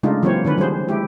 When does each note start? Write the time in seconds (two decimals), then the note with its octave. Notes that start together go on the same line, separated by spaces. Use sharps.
0.03 C#3 G#3 A3 D4 D#4 F4
0.22 E3 F#3 A#3 C4 C5 C#5
0.44 D3 D#3 C#4 B4
0.58 F3 G3 G#4 C5
0.89 G#3 E4 G4